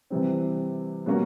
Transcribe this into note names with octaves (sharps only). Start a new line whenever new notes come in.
C3 E3 G3 C4
B2 G3 A#3 C#4 F#4